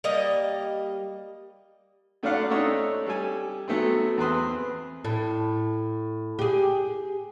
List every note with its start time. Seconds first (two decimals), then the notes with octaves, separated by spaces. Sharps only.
0.04 G3 A#3 D#5
2.23 F#2 A3 C#4 D5 F5 F#5
2.50 A3 C4 D4 D#4 C#5 E6
3.07 G3 A4 G#5
3.68 F#3 A3 B3 C4
4.18 E2 C4 G#4 B4 C6
5.05 A2
6.39 G4 G#4